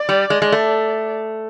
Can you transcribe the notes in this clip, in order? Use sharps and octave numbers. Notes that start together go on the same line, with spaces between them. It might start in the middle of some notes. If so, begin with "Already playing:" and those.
Already playing: D5
G3
G#3
G#3
A3